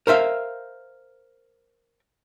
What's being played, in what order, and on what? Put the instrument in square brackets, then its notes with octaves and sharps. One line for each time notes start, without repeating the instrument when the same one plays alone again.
[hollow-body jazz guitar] A#4 C5 E5 F5